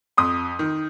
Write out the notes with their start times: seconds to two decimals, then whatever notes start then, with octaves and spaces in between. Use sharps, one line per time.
0.17 F2 C6 D#6
0.59 D#3